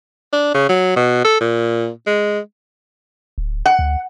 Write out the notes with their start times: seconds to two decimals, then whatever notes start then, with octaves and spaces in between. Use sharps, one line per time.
0.33 D4
0.54 C#3
0.69 F#3
0.96 B2
1.24 A4
1.40 A#2
2.07 G#3
3.38 D1
3.66 F#5
3.79 D2